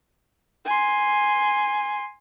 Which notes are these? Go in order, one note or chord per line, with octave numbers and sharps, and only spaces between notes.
G#5 C6